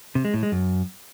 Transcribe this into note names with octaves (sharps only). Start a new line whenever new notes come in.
C3
G#3
A2
G#3
F#2